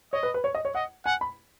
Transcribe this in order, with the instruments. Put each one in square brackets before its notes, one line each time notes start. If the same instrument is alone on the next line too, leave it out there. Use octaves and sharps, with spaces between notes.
[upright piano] C#5 [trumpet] D#5
[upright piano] B4
B4
C#5
D#5
C#5
[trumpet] D#5 [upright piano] F#5
[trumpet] F#5 [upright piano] G#5
[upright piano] B5